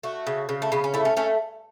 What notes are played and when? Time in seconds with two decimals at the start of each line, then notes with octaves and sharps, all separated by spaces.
0.03 A3 F#4
0.27 C#3
0.49 C#3
0.62 A3
0.72 C#3 B3
0.84 C#4
0.94 A3 E4
1.05 C#4
1.17 A3 C#4